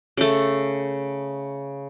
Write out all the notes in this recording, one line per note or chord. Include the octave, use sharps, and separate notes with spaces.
C#3 A3